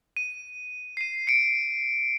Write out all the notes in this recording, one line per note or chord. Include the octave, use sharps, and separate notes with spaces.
D#7
C7 D#7
C#7 D7